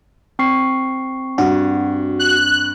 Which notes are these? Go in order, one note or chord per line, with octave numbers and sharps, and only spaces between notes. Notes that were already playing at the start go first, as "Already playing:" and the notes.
C4 C#6 C7
G2 F#4
F#6